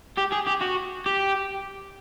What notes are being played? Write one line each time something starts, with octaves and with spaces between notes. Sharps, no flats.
G4
G#4
G4
F#4
G4